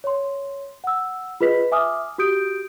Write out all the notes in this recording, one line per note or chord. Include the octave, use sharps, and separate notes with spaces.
C#5 C6
F#5 E6
F4 G#4 B4 D#5 B6
E5 G#5 D6 D#6 F6
F#4 G4 D#6 G6 D7